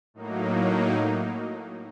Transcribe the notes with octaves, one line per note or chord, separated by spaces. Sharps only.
A2 F#3 A#3 D#4
D#4